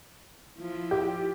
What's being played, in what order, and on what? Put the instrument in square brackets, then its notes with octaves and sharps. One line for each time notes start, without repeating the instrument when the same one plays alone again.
[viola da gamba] F3 E4 F4
[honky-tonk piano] G4